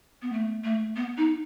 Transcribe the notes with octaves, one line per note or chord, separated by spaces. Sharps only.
B3
A3
A3
B3
D#4